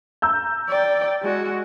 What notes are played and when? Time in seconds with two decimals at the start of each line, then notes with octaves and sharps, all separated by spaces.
0.22 A#5 E6 G6
0.69 D5 G5
1.22 G#3 F#4